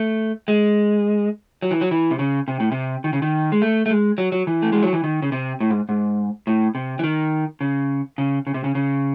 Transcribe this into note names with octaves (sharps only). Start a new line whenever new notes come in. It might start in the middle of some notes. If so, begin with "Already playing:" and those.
Already playing: A3
G#3
F#3
E3
F#3
E3
C3
C#3
C3
A2
C3
D#3
C#3
D#3
G#3
A3
A3
G#3
F#3
F#3
E3
A3
G#3
F#3
E3
D#3
C#3
C3
A2
G#2
G#2
A2
C3
E3
D#3
C#3
C#3
C#3
C3
C#3
C#3